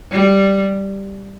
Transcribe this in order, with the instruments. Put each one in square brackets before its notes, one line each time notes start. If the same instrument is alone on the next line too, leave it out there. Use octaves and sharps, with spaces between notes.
[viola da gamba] G3